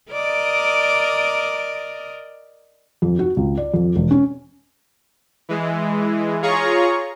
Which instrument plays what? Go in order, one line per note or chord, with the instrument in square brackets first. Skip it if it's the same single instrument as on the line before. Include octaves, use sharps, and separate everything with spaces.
[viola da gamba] A#4 D5 D#5
[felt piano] F2
F#4
C#2
D5
F2
E1
C#4
[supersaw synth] E3 G#3
F4 G#4 C#5 A#5 C#6